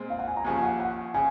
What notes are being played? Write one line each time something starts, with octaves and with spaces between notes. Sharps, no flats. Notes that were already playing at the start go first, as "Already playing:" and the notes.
Already playing: A#2 G#3 C4
F5
F#5
G#5
A#5
D#2 C#3 F3 G#5
F#5
F#5
C#3 G#5